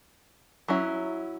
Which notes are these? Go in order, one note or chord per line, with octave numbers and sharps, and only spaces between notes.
F#3 C#4 E4